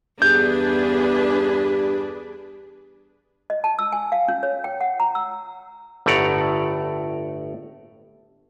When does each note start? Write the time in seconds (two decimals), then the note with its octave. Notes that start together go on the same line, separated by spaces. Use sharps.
0.22 E2 G2 D4 G#4 B4 G6
3.50 D#5
3.64 A5
3.79 E6
3.92 G#5
4.12 F5
4.28 C#4
4.43 C#5
4.64 G5
4.81 F#5
5.00 A#5
5.15 E6
6.06 G1 A2 A3 D5 F#5 A#5